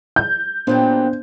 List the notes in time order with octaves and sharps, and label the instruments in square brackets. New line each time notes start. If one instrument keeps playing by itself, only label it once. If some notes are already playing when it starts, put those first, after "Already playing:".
[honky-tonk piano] G6
[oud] A#2 F#3 G3 [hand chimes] B3 D4 C5